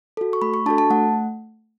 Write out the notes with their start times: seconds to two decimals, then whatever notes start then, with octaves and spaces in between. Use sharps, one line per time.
0.17 F#4 A4
0.33 C#6
0.42 A3 B5
0.54 C#6
0.66 D4 F#4 A4 A5
0.78 A5
0.90 A3 F#5